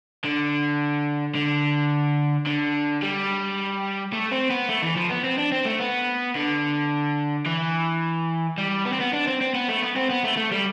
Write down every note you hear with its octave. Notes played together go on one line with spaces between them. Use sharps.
D3
D3
D3
G3
A3
C4
B3
A3
E3
F3
B3
C4
D4
C4
A3
B3
D3
E3
G3
B3
C4
B3
D4
C4
C4
B3
A3
B3
C4
B3
A3
A3
G3